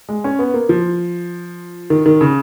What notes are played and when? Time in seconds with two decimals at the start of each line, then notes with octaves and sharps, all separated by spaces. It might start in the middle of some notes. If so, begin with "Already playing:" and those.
0.09 G#3
0.24 C#4
0.39 B3
0.54 A#3
0.69 F3
1.90 D#3
2.06 D#3
2.21 C#3